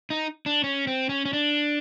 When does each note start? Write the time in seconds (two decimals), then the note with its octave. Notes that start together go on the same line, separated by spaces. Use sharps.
0.10 D#4
0.46 D4
0.64 C#4
0.87 C4
1.09 C#4
1.25 C#4
1.33 D4